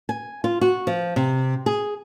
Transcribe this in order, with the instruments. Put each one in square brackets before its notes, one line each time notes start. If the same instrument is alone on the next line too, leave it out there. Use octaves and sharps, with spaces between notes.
[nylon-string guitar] G#5
F4
F#4
F3
C3
G#4